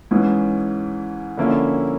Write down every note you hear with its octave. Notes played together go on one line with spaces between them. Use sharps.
G#2 E3 G#3 C#4
D3 F3 A#3 C#4 E4